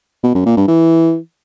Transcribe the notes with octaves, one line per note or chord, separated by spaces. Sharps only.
B2
F#2
A#2
G2
E3